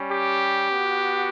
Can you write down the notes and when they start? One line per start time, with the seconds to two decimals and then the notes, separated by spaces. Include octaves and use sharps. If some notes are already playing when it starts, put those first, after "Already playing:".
Already playing: G3 C#4
0.11 G4
0.71 B3 F#4